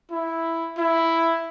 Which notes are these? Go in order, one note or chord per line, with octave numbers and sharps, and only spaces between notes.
E4
E4